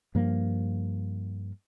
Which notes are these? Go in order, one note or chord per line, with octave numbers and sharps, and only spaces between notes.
G2 F3 A#3